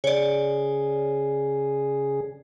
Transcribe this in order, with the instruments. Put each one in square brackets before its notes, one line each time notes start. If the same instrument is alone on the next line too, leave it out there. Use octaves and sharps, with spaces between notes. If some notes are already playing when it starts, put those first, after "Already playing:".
[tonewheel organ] C#3 G#4 [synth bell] C#5 D5